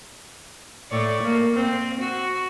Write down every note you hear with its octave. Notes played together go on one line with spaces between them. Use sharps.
A2 C#5 D5
A#3
C4
F#4